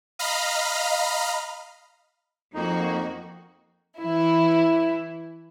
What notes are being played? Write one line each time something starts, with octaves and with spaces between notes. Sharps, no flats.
D#5 F5 A#5 B5 F6
F2 F3 A#3 D#4 F#4
E3 E4